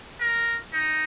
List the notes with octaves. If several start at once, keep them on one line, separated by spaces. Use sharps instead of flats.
A#4
D#4